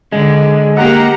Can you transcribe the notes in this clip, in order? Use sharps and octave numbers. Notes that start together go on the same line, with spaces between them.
D3 G#3
A#3 G4 F#5 A#5